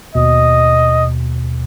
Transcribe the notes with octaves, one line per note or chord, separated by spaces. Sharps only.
D#2 B2 D#5